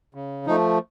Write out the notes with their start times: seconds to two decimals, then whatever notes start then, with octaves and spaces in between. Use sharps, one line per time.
0.14 C#3
0.47 F3 A3 D#4